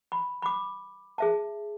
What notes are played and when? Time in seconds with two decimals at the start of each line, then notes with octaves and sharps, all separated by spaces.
0.12 B5
0.42 B5 D6
1.18 G#4 E5 A5